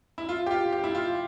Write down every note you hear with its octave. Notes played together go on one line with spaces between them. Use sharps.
E4
F4
G4
F4
G4
E4
F4